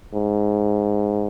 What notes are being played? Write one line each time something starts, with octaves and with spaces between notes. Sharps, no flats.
G#2